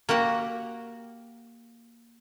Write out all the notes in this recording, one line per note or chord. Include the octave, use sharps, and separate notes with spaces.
A#3 F#4 G4 F#5